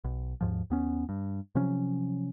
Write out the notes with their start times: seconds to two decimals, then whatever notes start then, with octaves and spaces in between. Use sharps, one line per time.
0.04 B1
0.41 D#2 G#2 F3
0.70 D#2 B3 C#4
1.09 G2
1.55 C3 F3 F#3 C#4